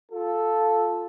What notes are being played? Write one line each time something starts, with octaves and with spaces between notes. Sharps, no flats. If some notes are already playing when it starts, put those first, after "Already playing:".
F4 A4